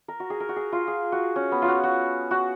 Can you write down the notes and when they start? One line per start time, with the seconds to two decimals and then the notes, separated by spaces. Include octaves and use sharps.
0.08 A#4
0.20 F#4
0.30 G#4
0.40 A#4
0.49 F#4
0.56 G#4
0.72 F4
0.88 G#4
1.12 F#4
1.36 C#4
1.52 B3
1.62 F4
1.68 F#4
1.83 F#4
2.31 F#4